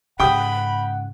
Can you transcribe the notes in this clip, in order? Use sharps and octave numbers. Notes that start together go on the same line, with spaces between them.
G#2 C#3 F#5 G5 B5 D#6